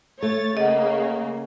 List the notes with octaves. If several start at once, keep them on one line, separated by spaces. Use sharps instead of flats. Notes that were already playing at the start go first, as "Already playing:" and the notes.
A3 C#5 A6
C#3 A#3 D#5 F#5